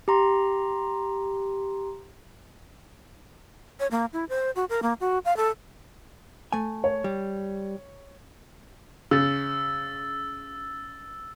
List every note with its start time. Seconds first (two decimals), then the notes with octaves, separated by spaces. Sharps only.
0.08 G4 A#5 C6
3.80 C#5
3.91 A#3
4.13 E4
4.29 C5
4.56 F#4
4.69 A#4
4.83 A#3
5.00 F#4
5.25 F5
5.37 A4
6.52 A3 G#5
6.84 C#5
7.04 G3
9.11 C#3 E6 A6